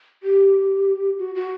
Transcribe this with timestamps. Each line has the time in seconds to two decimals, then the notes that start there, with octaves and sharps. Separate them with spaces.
0.23 G4
1.19 F#4
1.35 F#4